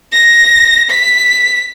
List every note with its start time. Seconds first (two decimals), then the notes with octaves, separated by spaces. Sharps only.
0.12 A#6
0.90 B6